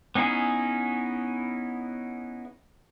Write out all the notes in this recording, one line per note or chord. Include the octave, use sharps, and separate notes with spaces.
B3 C#4 D#4 E4 G#4